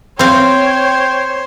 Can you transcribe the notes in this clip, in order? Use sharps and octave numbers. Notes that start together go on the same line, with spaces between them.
C4 C5 C#5 F5 G5